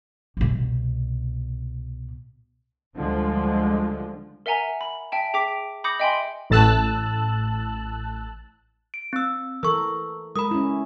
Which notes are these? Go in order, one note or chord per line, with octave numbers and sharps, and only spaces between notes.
C2 B2
D2 D3 F3 G3 G#3
A#4 E5 F#5 G#5 A#5
B5
E5 G5 A5
G#4 G5 D6 B6 D7
B5 D6 D#6 G6 A#6 C#7
D#5 E5 G5 G#5 B5 C6
A1 A2 A5 E6 F#6
D7
C4 E6
E3 A4 A#4 C#6 E6
G#3 A#4 B5 D#6
C#4 E4